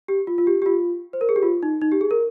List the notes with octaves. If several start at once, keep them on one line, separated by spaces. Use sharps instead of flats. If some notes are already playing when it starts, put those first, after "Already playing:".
G4
F4
F4
G4
G4
F4
C5
A#4
G#4
G4
F4
D#4
D#4
G4
G#4
A#4